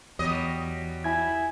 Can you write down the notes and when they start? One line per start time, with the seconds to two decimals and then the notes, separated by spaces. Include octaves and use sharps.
0.19 E2 F#3 G3 D#5
1.04 E4 G#5 G#6